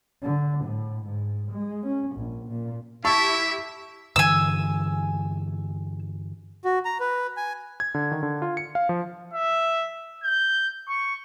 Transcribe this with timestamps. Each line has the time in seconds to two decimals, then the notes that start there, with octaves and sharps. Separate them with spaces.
0.22 D3
0.64 A2
1.04 G#2
1.51 G#3
1.86 C#4
2.16 A#1
2.48 A#2
3.05 E4 G4 A4 E5 C#6
4.16 G2 D3 E3 G#5 E6
6.64 F#4
6.85 A#5
7.00 B4
7.37 G#5
7.80 G#6
7.95 D3
8.12 D#3
8.23 D3
8.42 F4
8.57 C#7
8.75 F5
8.89 F3
9.34 E5
10.24 G6
10.89 C#6